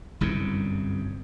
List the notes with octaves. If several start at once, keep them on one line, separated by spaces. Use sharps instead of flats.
G1 C2 F#2 C3